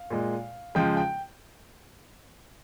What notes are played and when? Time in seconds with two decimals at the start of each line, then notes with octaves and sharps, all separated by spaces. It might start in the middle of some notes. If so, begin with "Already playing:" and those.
Already playing: F5
0.10 A#2 G#3
0.75 C#3 F3 G#3 G5
0.97 G5